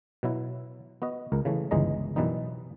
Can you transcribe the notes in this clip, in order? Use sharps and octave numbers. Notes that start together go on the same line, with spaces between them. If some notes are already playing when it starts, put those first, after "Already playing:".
B2 F#3 E4
B3 F#4 D#5
C#2 A#4
C#3 E3 A3
G1 C#2 E3 G#3 D#5 A#5
F#2 B2 E3 G3 B3 D#4